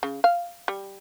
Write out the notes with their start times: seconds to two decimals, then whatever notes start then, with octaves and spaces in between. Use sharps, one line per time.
0.03 C#3
0.24 F5
0.68 G3